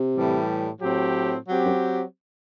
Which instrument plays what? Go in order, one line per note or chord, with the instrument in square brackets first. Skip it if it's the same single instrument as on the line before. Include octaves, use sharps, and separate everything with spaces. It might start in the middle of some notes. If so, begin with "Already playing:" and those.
Already playing: [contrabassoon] C3
[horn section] A2 E3 G3
A2 F#3 C4 G4
F#3 C4 G4
[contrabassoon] F#2